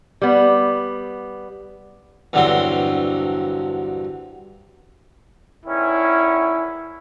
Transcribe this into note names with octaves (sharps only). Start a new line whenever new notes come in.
G3 B3
E2 G2 D3 F#3 C4 C6
E2 D#3 C#4 E4